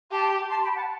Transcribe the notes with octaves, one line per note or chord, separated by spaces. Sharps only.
G4 A5 C6
A5 C6
G5 B5
F#5 A5